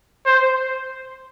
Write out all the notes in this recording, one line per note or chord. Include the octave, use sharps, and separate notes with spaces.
C5